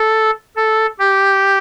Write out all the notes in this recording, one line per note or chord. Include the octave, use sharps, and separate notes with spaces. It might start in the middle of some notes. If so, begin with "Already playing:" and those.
Already playing: A4
A4
G4